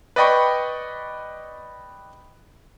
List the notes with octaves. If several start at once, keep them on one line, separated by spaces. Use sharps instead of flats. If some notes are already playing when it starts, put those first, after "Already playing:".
B4 D5 D#5 G5 B5 C#6